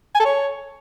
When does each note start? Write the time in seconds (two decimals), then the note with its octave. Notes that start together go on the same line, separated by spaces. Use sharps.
0.15 G#5
0.20 A4
0.25 C#5